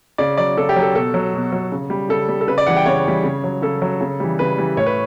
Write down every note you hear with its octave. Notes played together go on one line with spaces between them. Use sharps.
C#3 D5
F#3 D5
C#3 A4
G4
F#3
A4
B2 A4
F#3
B2
F#3
C#3
G3
C#3 A4
G3
A4
C#3 B4
D5
E3 G3 F#5
G5
C#3 C#5
E3 G3
C#3
F#3
C#3 A4
F#3
C#3
E3 G3
C#3 B4
E3 G3
A2 C#5
B4